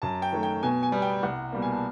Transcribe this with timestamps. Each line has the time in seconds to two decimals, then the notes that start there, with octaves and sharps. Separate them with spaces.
0.02 F#2 A5
0.22 G5
0.32 D#3 F#3 A3
0.43 G5
0.63 B2 G#5
0.83 G#5
0.92 G3 B3
1.02 G5
1.23 C2 F#5
1.52 B2 G3 A#3
1.62 G#5
1.73 A5